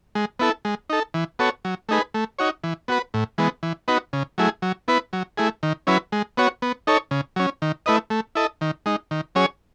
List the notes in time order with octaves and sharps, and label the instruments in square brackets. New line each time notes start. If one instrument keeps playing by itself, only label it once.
[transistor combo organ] G#3
B3 E4 A4
G#3
D#4 A4
E3
B3 F#4 A4 C#5
F#3
A3 D#4 G#4 B4
A3
D#4 F#4 C#5
E3
B3 F#4 B4
A2
E3 G#3 B3
E3
B3 D#4 F#4 B4
C#3
F#3 A3 E4 G#4
F#3
B3 E4 B4
F#3
A3 E4 G#4
D#3
F#3 C#4 E4 B4
G#3
B3 F#4 C#5
B3
D#4 A4 C#5
C#3
F#3 C#4
D#3
A3 E4 B4 D#5
A3
E4 A4 D#5
D#3
G#3 D#4
D#3
F#3 C#4 G#4 C#5